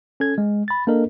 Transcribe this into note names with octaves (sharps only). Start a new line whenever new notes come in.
C#4 A4 G#6
G#3
B5 A6
A#3 D4 A4 A#4 D#5